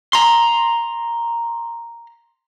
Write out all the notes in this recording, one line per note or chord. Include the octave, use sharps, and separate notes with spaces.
A#5 C6